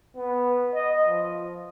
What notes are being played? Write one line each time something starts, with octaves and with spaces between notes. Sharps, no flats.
B3
D#5
F3